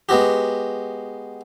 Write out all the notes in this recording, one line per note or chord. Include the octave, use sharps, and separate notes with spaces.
G#3 B3 F#4 G4